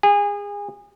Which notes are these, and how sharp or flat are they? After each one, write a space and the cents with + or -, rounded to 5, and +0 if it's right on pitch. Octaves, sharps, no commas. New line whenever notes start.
G#4 -30 G#5 -25